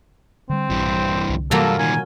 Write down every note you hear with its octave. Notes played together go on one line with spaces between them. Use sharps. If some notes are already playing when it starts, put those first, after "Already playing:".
D3 G3 C4
A#1 G2 E3
C2 D3
G2 C3 E3 F#3 G3 A#3 F4 A4
A#2 D#3 G#5